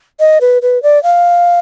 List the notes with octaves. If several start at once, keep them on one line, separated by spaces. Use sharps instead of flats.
D#5
B4
B4
D5
F5